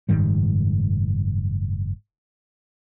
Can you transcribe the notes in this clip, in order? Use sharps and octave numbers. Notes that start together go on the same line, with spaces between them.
F#1 G#2 D#3 G3